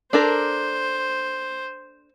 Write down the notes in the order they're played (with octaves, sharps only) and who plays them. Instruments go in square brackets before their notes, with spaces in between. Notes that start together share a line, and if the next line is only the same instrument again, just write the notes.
[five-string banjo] D4 A4 A#4 [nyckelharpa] C5